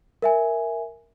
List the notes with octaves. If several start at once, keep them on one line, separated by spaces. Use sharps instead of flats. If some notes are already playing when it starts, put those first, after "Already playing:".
A#4 E5 G#5